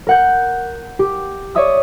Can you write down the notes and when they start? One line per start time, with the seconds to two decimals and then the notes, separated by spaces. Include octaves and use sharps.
0.07 A#4 F#5 G6
0.99 G4
1.55 C#5 D5 E5 D#6 E6